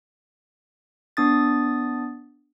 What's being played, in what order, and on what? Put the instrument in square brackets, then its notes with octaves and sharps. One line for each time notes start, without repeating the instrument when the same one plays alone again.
[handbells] B3 D4 D#6 A6